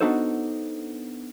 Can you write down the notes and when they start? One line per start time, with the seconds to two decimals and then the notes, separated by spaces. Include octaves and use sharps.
0.01 B3 D4 D#4 F#4 A4 C5